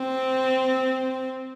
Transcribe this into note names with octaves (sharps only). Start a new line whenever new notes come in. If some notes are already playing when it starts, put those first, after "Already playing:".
Already playing: C4